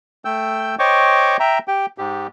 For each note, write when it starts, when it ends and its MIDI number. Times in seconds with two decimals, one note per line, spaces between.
0.25 0.75 57
0.25 0.75 79
0.25 0.75 88
0.25 0.75 91
0.79 1.37 72
0.79 1.37 73
0.79 1.37 75
0.79 1.37 79
0.79 1.37 85
0.79 1.37 86
1.40 1.59 76
1.40 1.59 79
1.40 1.59 82
1.68 1.86 67
1.68 1.86 79
1.98 2.27 44
1.98 2.27 67